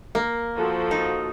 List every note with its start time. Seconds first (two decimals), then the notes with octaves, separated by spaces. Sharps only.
0.15 A#3
0.56 F3 F#4 A4
0.91 D#4